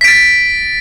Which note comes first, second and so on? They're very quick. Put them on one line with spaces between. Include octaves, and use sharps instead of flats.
B6 D7 A6